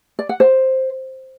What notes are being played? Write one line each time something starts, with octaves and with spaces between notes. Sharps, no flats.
D5
F#5
C5